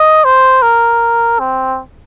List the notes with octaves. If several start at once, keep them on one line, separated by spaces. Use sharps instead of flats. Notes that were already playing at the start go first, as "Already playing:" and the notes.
Already playing: D#5
C5
A#4
C4